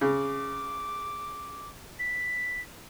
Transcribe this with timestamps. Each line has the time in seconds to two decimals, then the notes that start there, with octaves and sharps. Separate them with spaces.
0.01 C#3 D6
1.99 B6